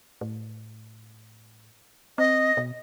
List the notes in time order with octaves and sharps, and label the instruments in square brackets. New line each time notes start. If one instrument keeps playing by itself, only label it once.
[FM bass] A2
[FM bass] C4 [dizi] D#5
[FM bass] B2